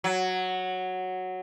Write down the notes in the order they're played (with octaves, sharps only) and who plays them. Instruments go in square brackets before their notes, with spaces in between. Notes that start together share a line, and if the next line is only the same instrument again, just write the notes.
[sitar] F#3